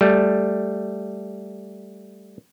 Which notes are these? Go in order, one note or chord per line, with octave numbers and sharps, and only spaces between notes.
G3 A3